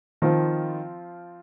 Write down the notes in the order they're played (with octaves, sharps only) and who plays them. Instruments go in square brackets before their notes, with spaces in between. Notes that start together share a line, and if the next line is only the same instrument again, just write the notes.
[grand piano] D#3 [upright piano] F3 C4 F4